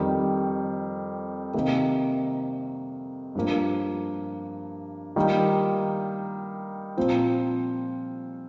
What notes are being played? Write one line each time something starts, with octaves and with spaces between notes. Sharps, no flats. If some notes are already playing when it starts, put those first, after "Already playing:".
Already playing: F2 D#3 G3
C3 D#3 A#3
G2 F3 A#3
D#3 G3 A#3 F4
A#2 F3 C4 F4